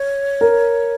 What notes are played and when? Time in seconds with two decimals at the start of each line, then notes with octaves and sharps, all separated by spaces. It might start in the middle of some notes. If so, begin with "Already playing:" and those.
Already playing: C#5
0.41 A#4